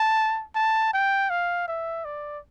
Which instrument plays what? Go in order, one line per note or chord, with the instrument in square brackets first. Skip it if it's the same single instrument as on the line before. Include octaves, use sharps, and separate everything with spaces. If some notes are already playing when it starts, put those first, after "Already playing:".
Already playing: [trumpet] A5
A5
G5
F5
E5
D5